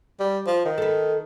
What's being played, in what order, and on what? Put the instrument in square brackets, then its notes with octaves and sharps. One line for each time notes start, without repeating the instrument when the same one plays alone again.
[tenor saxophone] G3
F3
D#3
[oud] A4 B4